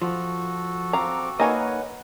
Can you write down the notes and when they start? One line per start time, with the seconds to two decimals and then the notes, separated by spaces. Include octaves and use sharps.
0.02 F3 F#4 A4
0.93 C4 F5 A#5 D6
1.40 A#3 D#4 B4 C#5 D#5 F#5 G#5